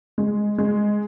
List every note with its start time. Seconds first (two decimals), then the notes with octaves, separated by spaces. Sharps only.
0.18 G#3
0.58 G#3